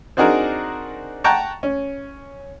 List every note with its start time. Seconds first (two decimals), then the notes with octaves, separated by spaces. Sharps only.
0.17 C4 D4 D#4 F#4 G#4 A#4
1.24 F#5 G5 A5 A#5 C#6
1.63 C#4